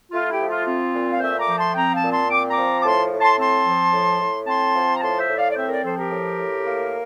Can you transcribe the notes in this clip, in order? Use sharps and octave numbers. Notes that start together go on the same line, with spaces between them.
A3 F4
E4 G4
F3
F4
C4 F4
A#2
F5
A3 C5 E5
A#5 D6
F3
A5 C6
C4 G5 A#5
F5 A5
A#2
A5 C6
C4 D6
A#5 D6
F3
D6
A2 A5 C6
A2
A5 C6
C4 A5 C6
F3
A2
A2
C4 A5 C6
F3
A#5
A2 A5 C6
C5 E5
A2
D5 F5
D5
C4 C5 E5
A#4 D5
F3 A4 C5
G4 A#4
A2
A2
A#3